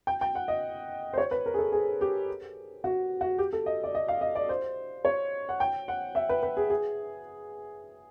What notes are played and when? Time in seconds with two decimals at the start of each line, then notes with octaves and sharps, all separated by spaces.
0.07 G5
0.21 G5
0.35 F#5
0.48 D#5
1.13 C5
1.18 C#5
1.31 B4
1.46 A#4
1.54 G#4
1.58 A4
1.72 G#4
2.01 G4
2.84 F#4
3.21 F#4
3.38 G4
3.53 A4
3.66 D#5
3.84 D5
3.94 D#5
4.08 F5
4.21 D#5
4.35 D5
4.49 C5
5.05 C#5
5.49 F#5
5.60 G5
5.88 F#5
6.15 E5
6.29 B4
6.43 B4
6.57 G#4
6.70 G#4